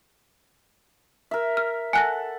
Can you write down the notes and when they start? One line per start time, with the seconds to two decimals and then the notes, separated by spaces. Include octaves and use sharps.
1.31 A#4 E5
1.57 F6
1.93 A4 F#5 G#5 F#6 A#6